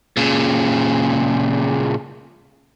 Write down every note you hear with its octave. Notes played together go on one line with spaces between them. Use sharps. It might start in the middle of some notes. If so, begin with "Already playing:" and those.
A#2 C#3